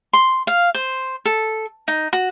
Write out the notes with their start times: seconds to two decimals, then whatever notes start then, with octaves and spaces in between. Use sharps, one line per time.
0.13 C6
0.47 F5
0.75 C5
1.25 A4
1.88 D#4
2.13 F#4